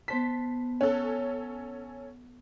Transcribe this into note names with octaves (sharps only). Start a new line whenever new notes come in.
B3 C5 A5 B6
C#4 A4 C#5 F#5